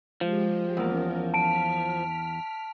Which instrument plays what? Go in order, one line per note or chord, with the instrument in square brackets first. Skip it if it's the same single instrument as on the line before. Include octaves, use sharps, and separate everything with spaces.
[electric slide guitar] F3 [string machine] G#3 G4
[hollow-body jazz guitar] E2 A#3 [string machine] C#4 A#4
[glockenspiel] A5 D7 [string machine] F6 B6